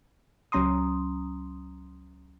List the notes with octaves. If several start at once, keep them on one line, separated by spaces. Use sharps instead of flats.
C#2 F#3 C#4 A#5 C6 D#6